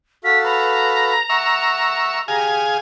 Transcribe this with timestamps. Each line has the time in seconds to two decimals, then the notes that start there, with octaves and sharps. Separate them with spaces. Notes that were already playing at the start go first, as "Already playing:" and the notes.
0.24 F#4 A4 F5 B6
0.44 B4 A#5
1.30 E5 F#5 C#6
2.28 G4 G#4 F5 G#5